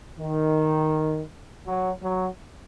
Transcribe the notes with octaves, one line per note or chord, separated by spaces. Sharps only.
D#3
F#3
F#3